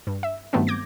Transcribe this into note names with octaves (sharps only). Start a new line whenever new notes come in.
G2
E5
G2 D#3 F#3 A3 B3 C4
D6 G6 G#6 A#6